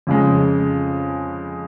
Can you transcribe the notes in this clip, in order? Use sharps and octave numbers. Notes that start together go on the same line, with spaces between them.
F2 C#3 G#3